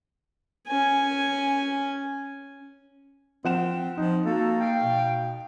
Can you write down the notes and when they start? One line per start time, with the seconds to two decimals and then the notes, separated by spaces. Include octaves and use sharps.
0.68 C#4 G#5
3.44 F3 C4 F#5 E7
3.97 F3 D#4
4.25 A#3 F#4 A4
4.60 F5 G5
4.82 B2